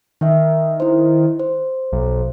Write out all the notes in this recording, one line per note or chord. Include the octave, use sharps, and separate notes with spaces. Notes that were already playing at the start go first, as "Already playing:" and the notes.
D#3 D#4 E5
E4 C5
C5
B1